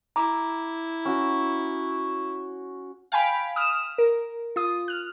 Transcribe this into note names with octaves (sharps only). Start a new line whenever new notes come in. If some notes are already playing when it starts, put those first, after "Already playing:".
E4 A#5 D6
C#4 F#4
F5 G5 G#5 B5 D7
D#6 F6 E7
A#4
F4 D#6
F6 F#6